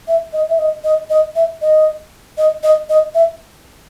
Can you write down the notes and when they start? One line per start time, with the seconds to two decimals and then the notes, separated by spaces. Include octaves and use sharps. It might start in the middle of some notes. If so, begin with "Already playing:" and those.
0.08 E5
0.33 D#5
0.49 E5
0.58 D#5
0.84 D#5
1.10 D#5
1.36 E5
1.62 D#5
2.38 D#5
2.63 D#5
2.89 D#5
3.15 E5